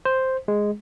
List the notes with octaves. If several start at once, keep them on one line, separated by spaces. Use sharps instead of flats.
C5
G#3